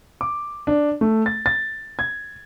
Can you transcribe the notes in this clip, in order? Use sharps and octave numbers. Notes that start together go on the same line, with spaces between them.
D6
D4
A3
A6
A6
G#6